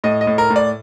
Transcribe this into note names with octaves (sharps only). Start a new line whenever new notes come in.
A2 D#5
D#5
A2
A#4
A2
D5